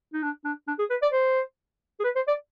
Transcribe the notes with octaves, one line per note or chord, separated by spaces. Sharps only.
D#4
D4
D4
D4
G#4
B4
D5
C5
G#4
B4
C5
D5